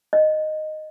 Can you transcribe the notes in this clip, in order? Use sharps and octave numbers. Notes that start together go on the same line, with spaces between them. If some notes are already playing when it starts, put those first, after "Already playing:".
D#5